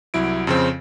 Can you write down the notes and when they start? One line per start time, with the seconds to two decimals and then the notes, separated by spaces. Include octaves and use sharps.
0.14 C2 F#3 E4 D7
0.47 F2 C#3 C4